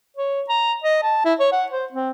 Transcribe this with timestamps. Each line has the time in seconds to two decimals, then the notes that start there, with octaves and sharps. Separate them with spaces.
0.17 C#5
0.49 A#5
0.84 D#5
1.03 A5
1.25 E4
1.40 C#5
1.52 F#5
1.72 C5
1.92 C4